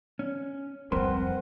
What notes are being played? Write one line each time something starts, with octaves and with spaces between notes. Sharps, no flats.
C#4
F2 F3 G3 C4 A#4 B4 F#5 C6